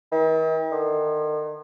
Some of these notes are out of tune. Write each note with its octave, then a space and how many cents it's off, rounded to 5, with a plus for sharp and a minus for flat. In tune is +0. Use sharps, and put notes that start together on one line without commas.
D#3 +45
D#3 -45